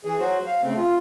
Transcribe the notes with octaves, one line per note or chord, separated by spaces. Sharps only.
E3 G#4
F#3 F#4 C5
F5
C#3 A3 C4
F4